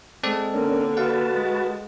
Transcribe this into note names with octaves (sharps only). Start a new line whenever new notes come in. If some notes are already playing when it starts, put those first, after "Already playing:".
G#3 C4 A4 D5
D3 A#3 C#4 D4 A#4
F#4 B4 F5 F#5 A5
G#3